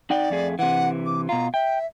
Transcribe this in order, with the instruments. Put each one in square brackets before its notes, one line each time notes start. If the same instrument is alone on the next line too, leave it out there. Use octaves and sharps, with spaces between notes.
[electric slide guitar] D#4 F#5 G5 [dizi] D5
[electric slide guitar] F2 A3 G#4
[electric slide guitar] C3 E3 [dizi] F#5
[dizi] D6
[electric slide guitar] B2 F4 [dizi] A#5
[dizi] E5 [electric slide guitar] G5